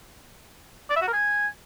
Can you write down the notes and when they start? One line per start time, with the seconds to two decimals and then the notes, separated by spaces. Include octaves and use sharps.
0.90 D5
0.96 E5
1.02 F#4
1.07 A#4
1.13 G#5